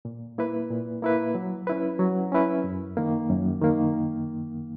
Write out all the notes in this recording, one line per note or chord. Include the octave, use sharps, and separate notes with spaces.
A#2
A#3 E4 B4
A#2
A#3 E4 B4
F#3
C#4 E4 B4
F#3
C#4 E4 B4
F#2
D#3 A#3
F#2
D#3 A#3